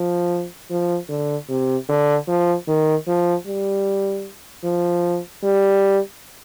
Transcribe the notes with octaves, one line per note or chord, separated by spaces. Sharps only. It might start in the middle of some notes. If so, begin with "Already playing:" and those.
Already playing: F3
F3
D3
C3
D3
F3
D#3
F3
G3
F3
G3